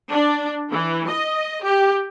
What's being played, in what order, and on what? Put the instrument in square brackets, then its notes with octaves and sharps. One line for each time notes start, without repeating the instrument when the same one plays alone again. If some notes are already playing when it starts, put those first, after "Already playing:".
[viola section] D4
E3
D#5
G4